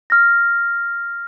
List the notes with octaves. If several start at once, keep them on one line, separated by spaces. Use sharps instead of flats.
F6 A#6